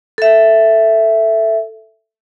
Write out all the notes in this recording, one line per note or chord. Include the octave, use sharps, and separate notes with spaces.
A4 E5